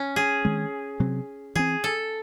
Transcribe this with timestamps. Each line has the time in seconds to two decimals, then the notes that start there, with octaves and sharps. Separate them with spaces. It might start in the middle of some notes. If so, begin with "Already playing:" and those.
Already playing: C#4
0.16 G#4
0.45 D#3 G#3 C4
1.00 C3 F#3 C4
1.56 E3 C4 G#4
1.84 A4